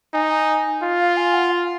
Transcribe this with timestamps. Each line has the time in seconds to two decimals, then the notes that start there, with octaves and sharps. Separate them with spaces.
0.13 D#4 G#5
0.29 G#5
0.83 F4
1.00 F5
1.17 G#5
1.34 F#5
1.51 F5